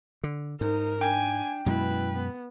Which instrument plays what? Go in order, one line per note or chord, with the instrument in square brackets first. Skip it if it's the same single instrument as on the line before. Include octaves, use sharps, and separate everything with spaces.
[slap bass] D3
[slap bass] G#2 [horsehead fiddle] D#4 A#4
[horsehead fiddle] D4 [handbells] G5 [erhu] G#5
[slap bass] F#2 B2 G#3 [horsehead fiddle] B3 E4 [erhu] B4
[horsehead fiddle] B3